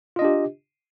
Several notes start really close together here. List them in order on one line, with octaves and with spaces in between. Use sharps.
F4 D#5 D4 G4